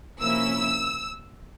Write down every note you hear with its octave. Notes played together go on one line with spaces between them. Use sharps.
C3 F3 A#3 C#4 E4 E6